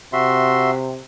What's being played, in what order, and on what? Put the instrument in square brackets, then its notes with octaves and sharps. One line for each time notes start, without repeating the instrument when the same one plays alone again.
[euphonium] C3 [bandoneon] F#4 E5 C6